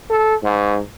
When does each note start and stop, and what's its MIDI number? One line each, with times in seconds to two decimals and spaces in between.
0.10 0.35 69
0.44 0.81 44